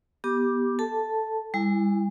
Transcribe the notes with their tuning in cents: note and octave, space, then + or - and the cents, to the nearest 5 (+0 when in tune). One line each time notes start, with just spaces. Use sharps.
B3 -20 G4 +0 D6 +0
A4 +0 A5 +0
G3 +40 E4 +0 G#5 -20